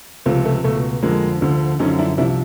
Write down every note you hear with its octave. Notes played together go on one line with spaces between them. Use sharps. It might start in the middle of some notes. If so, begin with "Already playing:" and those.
C#2 C3 F3 A3
A3
C#2 B2 A3
F2 D3 F3 G#3 A#3
D2 D3 F3
F#2 D3 F3 C#4 D#4
D4 E4
C2 C3 F3 D4 E4